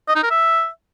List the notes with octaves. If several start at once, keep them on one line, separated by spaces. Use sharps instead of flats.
D#5
D#4
A#4
E5